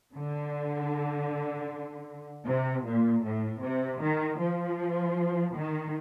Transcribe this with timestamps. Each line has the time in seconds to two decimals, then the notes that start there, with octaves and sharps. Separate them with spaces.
0.15 D3
2.47 C3
2.86 A#2
3.25 A2
3.63 C3
4.02 D#3
4.40 F3
5.56 D#3